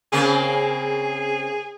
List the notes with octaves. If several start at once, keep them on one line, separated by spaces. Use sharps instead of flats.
C#3 A#3 C4 G#4